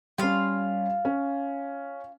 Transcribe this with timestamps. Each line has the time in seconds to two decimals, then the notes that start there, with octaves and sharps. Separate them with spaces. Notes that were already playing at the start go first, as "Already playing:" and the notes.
0.18 G3 C#4 F4 F5 C6
1.05 C#4